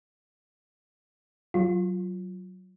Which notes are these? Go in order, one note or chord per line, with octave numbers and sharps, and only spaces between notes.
F#3 F4